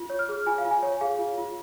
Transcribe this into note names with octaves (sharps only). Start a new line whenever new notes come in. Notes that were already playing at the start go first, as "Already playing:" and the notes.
Already playing: F4
C#5
F6
G#4
F4 G#5
F5
F4
G#5
C#5
G#4 F5
F4
F4